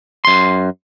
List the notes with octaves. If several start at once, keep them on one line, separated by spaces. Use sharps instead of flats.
F#2 C6